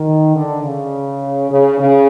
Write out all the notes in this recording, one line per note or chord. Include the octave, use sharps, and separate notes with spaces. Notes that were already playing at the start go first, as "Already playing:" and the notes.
Already playing: D#3
D3
C#3
C#3
C#3